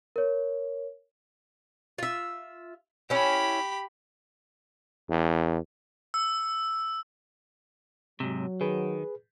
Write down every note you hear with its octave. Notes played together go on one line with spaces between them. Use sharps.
A#4 C#5
F4 E5
C#4 E4 G4 B5
E2
E6
G#2 C3 F#3
D#3 G#4 B4